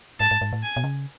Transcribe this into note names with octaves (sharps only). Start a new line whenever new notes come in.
G#2 A5
G#2
G#2
A2
G#5
B2
C#3